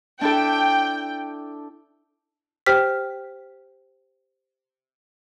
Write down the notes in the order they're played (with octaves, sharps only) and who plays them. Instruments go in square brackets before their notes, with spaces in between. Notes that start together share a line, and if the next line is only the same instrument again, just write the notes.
[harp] D4 E4 A4 [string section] G5
[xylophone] G4 C5 G5 F6 B6